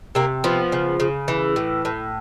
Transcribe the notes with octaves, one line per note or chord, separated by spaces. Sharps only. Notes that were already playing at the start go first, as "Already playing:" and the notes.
C3 A#3
F3 B3
C#3
C#3
E3
A2
A2